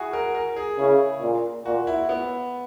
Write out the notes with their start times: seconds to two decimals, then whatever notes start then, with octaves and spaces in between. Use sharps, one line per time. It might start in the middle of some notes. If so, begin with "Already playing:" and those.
Already playing: E4 F#4 G#4
0.13 A#4
0.35 A#4
0.56 G#4
0.79 C#3 E4
1.21 A#2
1.66 A#2 F#4
1.87 E4
2.09 B3